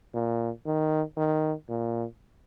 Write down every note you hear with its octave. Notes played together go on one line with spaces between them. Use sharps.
A#2
D#3
D#3
A#2